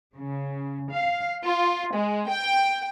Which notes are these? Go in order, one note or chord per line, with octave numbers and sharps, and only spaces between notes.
C#3
F5
F4
G#3
G5